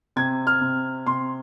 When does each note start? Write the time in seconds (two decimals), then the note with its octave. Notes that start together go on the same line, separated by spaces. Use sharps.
0.16 C3 G#6
0.47 F6
0.61 C3
1.06 C3 C6